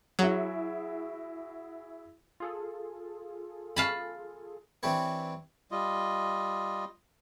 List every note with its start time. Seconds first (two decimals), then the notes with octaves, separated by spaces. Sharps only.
0.19 F#3 E4 F#4 G#4
2.40 F4 G#4 A4
3.76 F5 A5 B5
4.83 E3 C4 D4 G4 B4 C#5
5.71 G3 F4 D#5